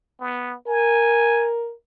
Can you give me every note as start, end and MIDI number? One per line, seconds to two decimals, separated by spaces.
0.20 0.56 59
0.67 1.73 70
0.67 1.49 80